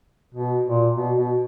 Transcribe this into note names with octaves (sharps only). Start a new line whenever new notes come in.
B2
A#2
B2
B2